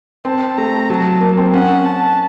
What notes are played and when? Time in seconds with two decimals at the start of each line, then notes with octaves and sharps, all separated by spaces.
0.25 C4 A5
0.57 A3 A#5
0.89 F#3 A5
1.21 A#3
1.37 C4
1.53 C#4 F#5
1.85 A5